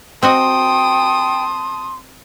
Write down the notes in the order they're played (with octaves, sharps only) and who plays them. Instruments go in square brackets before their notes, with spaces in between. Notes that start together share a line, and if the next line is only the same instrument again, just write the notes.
[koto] C4 F#4 D#5 [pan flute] G5 [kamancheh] A5 D#6 [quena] C6